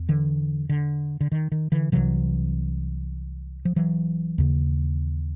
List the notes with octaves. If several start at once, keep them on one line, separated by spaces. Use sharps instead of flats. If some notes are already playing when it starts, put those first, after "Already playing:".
Already playing: E2
D3 E3
D3
D3
D#3
D#3
D3 E3
C2 C3 E3 F#3
F3
E3 F#3
D#2 C#3